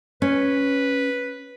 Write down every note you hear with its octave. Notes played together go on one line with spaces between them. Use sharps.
C#4 B4